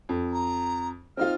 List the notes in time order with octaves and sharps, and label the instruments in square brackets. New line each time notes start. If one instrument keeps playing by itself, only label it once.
[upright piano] F2
[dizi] A#5
[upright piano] C4 D#4 F4 [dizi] F6